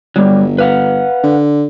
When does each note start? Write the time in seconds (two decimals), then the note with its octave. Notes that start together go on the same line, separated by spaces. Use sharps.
0.16 G1 F#3 G3
0.59 B4 F5 F#5
1.23 D3